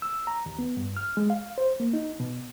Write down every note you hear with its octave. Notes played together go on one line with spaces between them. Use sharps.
E6
A#5
D#2
B3
G2
F6
G#3
F5
C5
A#3
D#4
B2